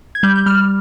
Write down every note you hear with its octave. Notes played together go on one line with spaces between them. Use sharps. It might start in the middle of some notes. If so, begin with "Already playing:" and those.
G#6
G3 G6
G6
G3 F6